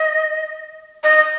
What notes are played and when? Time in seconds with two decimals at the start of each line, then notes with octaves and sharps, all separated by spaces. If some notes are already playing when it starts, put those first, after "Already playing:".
Already playing: D#5
1.04 D#5